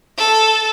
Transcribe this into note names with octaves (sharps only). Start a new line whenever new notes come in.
A4